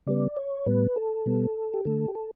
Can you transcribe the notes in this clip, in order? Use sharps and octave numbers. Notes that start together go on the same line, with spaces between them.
C#3 G3 B3 D5
C#5
A2 G3 B3 B4
A4
B2 G3 B3
G4
D3 A3 A4
G4
A4